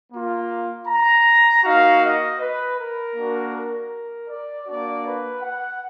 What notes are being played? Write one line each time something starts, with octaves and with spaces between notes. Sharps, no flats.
A#3 F4
A#5
A#3 D#4 F#4 F5
D#5
B4
A#4
A#3 D4 F#4
A#4
D5
A#3 D4 F#4 D5
B4
F#5